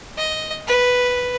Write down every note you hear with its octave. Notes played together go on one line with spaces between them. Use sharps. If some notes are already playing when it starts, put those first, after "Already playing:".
D#5
B4